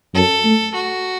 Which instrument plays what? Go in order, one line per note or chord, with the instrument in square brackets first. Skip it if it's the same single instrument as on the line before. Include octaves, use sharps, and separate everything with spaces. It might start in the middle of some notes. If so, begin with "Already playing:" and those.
[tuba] F#2 [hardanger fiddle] A4
[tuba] A3
[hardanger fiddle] F#4